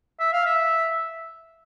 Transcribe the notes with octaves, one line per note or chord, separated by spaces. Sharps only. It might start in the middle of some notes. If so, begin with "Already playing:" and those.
E5
F5
E5